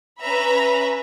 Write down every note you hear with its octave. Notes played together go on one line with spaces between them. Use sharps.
C#4 B4 E5 A#5 B5